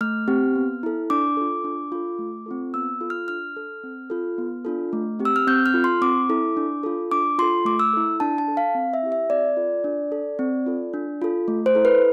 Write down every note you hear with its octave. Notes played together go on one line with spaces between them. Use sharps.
A3 F6
C4 G4
B3
E4 A4
D4 D6
F4 A4
D4
F4 A4
A3
C4 F4 A4
B3 E6
F4 A4
F6
D4 F6
A4
C4
F4 A4
B3
D4 F4 A4
A3
C4 G4
E6
F6
C4 G6
F6
F4 A4
C6
C4 D6
E4 A4
D4
F4 A4
D4 D6
F4 A4 C6
A3 D6
E6
E4 A4
D4 A5
A5
A4
F5
C4
E5
E4 G4
E5
C4 D5
F4 A4
D4
A4
C4
F4 A4
D4
F4 A4
A3
C5
E4 A4
B4